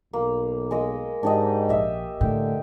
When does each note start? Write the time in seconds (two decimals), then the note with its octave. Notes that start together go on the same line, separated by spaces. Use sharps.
0.13 B1 A#3
0.71 G#3 A#3 D#5
1.23 G#2 D4 G4 D#5
1.69 A#1 D#5 E5
2.21 A2 D3 G5